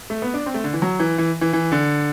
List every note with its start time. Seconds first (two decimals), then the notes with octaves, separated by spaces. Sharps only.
0.10 A3
0.22 B3
0.34 D4
0.46 C4
0.54 A3
0.64 D3
0.73 E3
0.82 F#3
0.99 E3
1.18 E3
1.41 E3
1.53 E3
1.72 D3